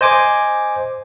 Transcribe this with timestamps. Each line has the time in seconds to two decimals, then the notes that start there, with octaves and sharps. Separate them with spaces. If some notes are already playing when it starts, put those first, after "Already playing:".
0.01 C5 D#5 G#5 D6